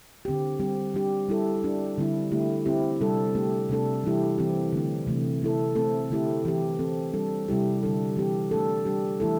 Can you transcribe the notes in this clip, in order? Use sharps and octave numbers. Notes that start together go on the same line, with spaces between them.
D3 C4 G4
G3 C4 G4
G3 D4 G4
G3 E4 A4
G3 D4 G4
D3 G3 C4 E4
D3 A3 E4 G4
D3 C4 E4 G4
C3 G3 D4 A4
A3 D4 G4
C3 A3 D4 A4
E3 G3 E4 G4
E3 C4 G4
D3 A3 D4
C3 E3 A3
A3 E4 A4
A3 C4 A4
D3 A3 E4 G4
E3 C4 G4
E3 C4 A4
G3 D4 A4
C3 G3 E4 G4
D3 G3 D4 A4
E3 C4 G4
A3 D4 A4
G3 D4 G4
E3 A3 E4 A4